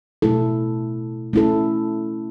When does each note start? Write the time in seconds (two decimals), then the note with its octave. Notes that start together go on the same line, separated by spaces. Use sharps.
0.22 B2 A3 E4 A4
1.33 A3 C#4 E4 A4